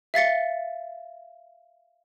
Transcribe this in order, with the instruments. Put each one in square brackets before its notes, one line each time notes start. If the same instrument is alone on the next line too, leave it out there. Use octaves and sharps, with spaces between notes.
[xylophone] E5 F5 A6 C#7